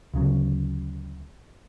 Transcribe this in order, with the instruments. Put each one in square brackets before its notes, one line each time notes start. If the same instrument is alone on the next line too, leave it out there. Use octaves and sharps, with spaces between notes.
[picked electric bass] D2 C#3 F#3